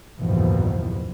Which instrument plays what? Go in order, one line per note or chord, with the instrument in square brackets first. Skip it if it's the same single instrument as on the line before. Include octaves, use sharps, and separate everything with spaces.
[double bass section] F#1 D#2 G#2 B2 E3 F3